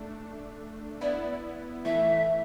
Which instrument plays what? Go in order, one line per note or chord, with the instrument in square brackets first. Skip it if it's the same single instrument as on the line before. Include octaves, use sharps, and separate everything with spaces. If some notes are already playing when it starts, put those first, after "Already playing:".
Already playing: [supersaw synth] A3 D4
[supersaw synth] B3 E4 [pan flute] D5
[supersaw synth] E3 A3 [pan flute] E5